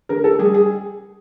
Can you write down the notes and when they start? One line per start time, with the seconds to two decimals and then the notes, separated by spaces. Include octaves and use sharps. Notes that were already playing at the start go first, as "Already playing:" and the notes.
0.09 D3 A#4
0.24 A4
0.39 G3 G#4
0.54 G#4